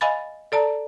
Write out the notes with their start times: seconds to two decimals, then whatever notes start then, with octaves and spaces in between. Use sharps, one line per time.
0.01 D#5 F5 G#5 B5 A6
0.52 A4 D5 A5 A#5